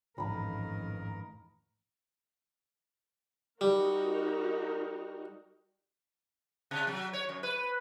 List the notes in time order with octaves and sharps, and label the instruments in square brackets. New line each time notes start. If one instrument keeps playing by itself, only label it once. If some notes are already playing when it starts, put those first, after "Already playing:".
[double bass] A1 F2 [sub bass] G#2 [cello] D#3 A#4 [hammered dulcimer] F5 A#5 B5
[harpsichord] G3 [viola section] D#4 F#4 A#4
[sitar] C3
F#3
C#5
F#2
B4